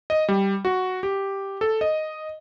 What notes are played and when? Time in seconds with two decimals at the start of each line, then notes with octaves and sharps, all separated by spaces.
0.10 D#5
0.29 G3
0.65 F#4
1.03 G4
1.61 A4
1.81 D#5